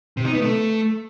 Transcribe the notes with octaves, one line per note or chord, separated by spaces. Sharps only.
C3
D#4
B3
A3